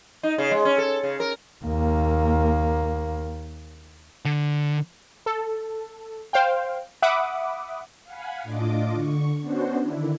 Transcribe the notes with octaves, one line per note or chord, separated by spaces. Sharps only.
D#4
C#3
G#3
C#4
A4
C#3
A#4
D#2 A#3
D3
A4
C5 F5 G5
E5 F#5 B5 D6 D#6
F5 F#5 G#5 B5
A2 D4 F4 D#5 D6
D3 C#6
B3 C#4 D4 F#4 C5
D3 D#3 D4 E4